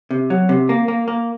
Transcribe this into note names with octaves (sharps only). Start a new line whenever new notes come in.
C3
F#3
C3
A#3
A#3
A#3